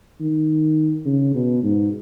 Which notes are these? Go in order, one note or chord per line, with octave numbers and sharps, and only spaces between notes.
D#3
C#3
B2
G#2